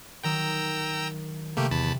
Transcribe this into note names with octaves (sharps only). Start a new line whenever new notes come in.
D#3 F#3 G5 A#5 E6
C3 A3 A#3 G4
E2 A5 B5